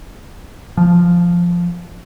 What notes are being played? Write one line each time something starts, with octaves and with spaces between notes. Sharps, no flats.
F3